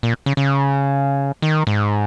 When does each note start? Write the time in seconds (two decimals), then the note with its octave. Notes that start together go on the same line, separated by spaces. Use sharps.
0.03 A#2
0.26 C#3
0.37 C#3
1.42 D#3
1.67 G#2